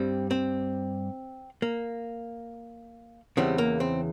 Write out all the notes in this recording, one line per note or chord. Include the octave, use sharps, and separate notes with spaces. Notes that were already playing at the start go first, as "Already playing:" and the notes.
Already playing: G2 G3 C4
C4
A#3
E2 C#3 E3 G3 C4
A#3
C4